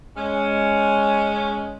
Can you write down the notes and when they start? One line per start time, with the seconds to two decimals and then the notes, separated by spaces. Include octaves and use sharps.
0.17 G#3 C#4